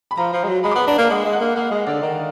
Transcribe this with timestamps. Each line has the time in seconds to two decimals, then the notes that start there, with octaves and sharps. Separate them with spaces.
0.11 B5
0.17 F3 A#5
0.33 F3
0.44 G#3
0.48 F#3
0.64 G#3 B5
0.71 D6
0.75 B3
0.80 B5
0.86 D4 A#5
0.98 A#3
1.11 G#3 F#5
1.25 G#3
1.33 F#5
1.40 A#3
1.56 A#3 F5
1.71 G#3 D#5
1.87 D3 D5
2.02 D#3